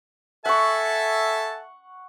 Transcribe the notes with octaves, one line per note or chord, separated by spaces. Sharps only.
A4 E5 F#5 G#5 A5 C#6